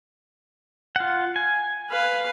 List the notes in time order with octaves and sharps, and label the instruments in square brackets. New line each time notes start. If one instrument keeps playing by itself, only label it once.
[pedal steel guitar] F4 F#5
G#5
[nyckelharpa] B4 F5